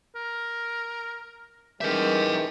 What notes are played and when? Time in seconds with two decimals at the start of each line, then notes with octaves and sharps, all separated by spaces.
0.16 A#4
1.81 D#3 E3 G#3 G4 A#4 E5